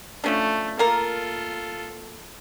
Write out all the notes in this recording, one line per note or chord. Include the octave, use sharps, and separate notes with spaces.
F3 A3 C#4 D4
A#3 F4 A4 A#4